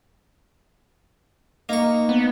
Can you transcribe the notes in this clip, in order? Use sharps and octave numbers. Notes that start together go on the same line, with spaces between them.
A#3 D#4 C#6
B3